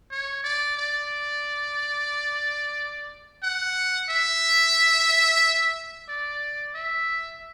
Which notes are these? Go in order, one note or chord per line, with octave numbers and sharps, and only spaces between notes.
C#5
D5
D5
F#5
E5
D5
E5